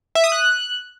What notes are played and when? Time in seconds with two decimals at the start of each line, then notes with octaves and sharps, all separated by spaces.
0.15 E5
0.24 D#6
0.32 F#6